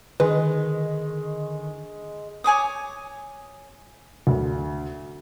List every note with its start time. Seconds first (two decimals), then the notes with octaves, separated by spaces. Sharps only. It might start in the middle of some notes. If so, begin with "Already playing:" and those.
0.20 D3 D#3 G#3 B4
2.44 C#5 G#5 D6 D#6
4.27 D2